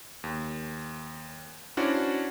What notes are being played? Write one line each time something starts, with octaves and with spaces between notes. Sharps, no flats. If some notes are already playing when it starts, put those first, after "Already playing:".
D#2
C#4 D4 E4 F#4 C5 D5